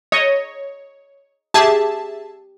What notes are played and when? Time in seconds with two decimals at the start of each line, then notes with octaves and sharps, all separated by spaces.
0.12 C#5 D#5
1.54 G4 G#4 E5 A5